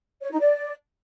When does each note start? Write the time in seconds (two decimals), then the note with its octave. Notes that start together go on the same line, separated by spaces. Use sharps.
0.22 C#5
0.31 D#4
0.39 D5